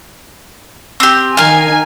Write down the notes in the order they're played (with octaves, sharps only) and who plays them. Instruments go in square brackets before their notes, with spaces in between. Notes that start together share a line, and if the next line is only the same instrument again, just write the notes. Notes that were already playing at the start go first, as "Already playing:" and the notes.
[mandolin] C4 G4
[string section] D#3 G#5 [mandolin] A#4 F5